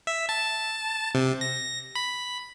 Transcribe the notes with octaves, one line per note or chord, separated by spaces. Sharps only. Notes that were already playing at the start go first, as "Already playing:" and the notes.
E5
A5
C3
A#6
B5